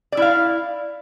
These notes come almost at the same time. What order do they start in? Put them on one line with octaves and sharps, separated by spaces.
D5 E4 F5